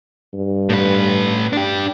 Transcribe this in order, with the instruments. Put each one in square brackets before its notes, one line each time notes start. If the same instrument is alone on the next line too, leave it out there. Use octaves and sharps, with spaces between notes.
[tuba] G2
[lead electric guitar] A2 B4
D4 G4